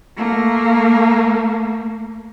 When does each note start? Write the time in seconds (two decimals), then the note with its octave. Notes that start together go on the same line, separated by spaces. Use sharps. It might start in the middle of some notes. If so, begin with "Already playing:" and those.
0.17 A3 A#3